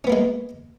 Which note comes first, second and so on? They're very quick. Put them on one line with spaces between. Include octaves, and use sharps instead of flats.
C#4 B3 A#3 G#3